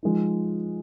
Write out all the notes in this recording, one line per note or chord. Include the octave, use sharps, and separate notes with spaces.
F3 G#3 D#4